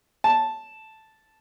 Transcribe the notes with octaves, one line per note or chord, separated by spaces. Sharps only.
A5